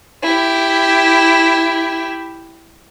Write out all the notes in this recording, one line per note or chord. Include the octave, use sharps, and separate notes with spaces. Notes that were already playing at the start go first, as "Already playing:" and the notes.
E4 G4